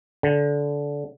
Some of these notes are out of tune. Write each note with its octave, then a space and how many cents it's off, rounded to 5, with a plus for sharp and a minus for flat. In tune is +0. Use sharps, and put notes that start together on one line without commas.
D3 -20